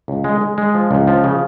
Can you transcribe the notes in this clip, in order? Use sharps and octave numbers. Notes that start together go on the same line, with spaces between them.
C#2
G#3
G#3
G#3
F3
C#2
F3
C#3